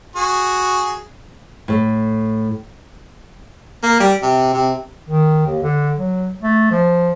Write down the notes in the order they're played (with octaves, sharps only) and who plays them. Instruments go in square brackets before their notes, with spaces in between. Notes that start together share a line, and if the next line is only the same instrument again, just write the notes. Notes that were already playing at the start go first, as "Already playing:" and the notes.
[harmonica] F#4 G#4
[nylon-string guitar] A2 A3
[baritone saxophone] A#3
G3
C3
C3
[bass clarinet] D#3
D#2
D3
F#3
A3
F3